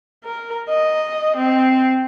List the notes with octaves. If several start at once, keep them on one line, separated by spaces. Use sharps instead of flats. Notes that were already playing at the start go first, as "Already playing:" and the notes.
A#4
D#5
C4